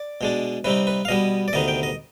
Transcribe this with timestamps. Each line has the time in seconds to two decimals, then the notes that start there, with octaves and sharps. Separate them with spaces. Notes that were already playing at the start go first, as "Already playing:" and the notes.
Already playing: D5
0.21 B2 G#3 D4
0.64 C3 G3 C4 D#4 B4
0.87 B4
1.05 F5
1.08 B2 G3 B3 D#5
1.48 D5
1.53 D2 C3 D#3 B3 D#4 D#5
1.68 G5
1.83 D#5